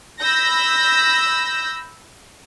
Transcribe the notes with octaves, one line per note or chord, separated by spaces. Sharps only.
B5 E6 G6 A#6